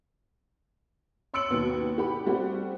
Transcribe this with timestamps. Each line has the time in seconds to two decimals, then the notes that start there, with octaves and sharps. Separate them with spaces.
1.34 C#5 C6 E6 C#7 D7 F#7
1.50 D#2 B2 B3
1.98 G4 F#5 B5
2.26 G3 A3 C4 F#4 G4